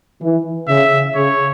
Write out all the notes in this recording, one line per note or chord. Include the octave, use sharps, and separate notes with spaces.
E3
C#3 E5
C#3 C#5